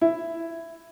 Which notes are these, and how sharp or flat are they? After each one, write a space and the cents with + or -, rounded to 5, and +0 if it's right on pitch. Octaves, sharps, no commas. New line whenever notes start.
E4 +10